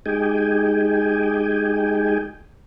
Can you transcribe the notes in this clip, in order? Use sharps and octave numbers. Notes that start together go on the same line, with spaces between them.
G#3 D#4 G4 G#4 G5 G#5